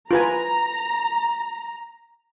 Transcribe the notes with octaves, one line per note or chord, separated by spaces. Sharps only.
F4 B4 G#5 A#5